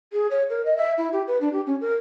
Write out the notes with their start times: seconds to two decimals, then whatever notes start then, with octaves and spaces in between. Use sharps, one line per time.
0.13 G#4
0.31 C#5
0.50 A#4
0.65 D#5
0.77 E5
0.98 E4
1.13 G4
1.27 B4
1.41 D4
1.53 G4
1.67 C#4
1.81 A#4